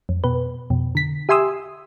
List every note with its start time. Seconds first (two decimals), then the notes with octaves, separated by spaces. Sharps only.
0.09 F2
0.24 B2 B4
0.70 F2 B2
0.95 D3 B6
1.29 G4 E5 G#5 C6 D#6 E6